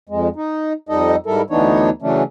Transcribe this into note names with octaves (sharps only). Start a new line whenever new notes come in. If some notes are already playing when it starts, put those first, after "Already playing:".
F2 G#3
D#4
F2 G3 D#4 A4 D#5
G#2 G3 E4 A4 A#4
D2 E3 B3 D4 D#4 C#5
C#3 E3 F#3 A3 C#4 D4